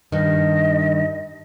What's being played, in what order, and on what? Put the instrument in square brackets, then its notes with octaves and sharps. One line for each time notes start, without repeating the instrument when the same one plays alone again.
[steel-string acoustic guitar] G2 D#3 [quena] D#5